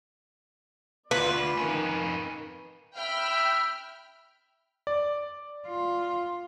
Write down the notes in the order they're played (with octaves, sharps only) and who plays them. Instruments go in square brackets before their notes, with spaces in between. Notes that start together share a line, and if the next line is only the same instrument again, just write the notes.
[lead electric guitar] D2 [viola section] F4 D5 [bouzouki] B4
[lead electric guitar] F2 C#4 [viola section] D#3
[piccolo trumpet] E5 [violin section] G5 B5 F6
[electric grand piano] D5
[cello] F4